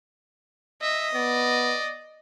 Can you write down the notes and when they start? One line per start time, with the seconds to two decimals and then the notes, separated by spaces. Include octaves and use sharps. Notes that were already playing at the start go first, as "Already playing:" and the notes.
0.81 D#5 E5
1.14 B3 D5